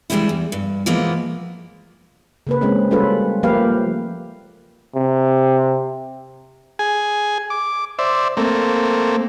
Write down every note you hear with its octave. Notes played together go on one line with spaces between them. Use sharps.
E3 G3 G#3 C4 D4 E4
E2
G2
B2 E3 F3 G#3 A#3 B3
C#3 A#3 B4
G#3 C4 C#4
F#3 G3 C#4 F4 A4 B4
F3 A3 A#3 G4 B4 F5
C3
G#4 G#5
D6
C5 D5 E5
A3 A#3 C4